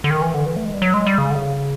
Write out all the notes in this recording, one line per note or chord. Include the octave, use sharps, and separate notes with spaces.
D3
D#3
E3
D3
E3
A3
G#3
G3
F#3
G#3
G3
C#3
D3
C#3